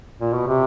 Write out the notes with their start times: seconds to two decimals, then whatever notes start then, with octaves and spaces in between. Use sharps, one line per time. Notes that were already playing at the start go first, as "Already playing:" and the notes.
0.20 A#2
0.34 B2
0.47 C3